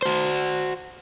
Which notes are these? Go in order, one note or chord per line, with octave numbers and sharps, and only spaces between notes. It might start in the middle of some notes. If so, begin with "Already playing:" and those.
F#4 C5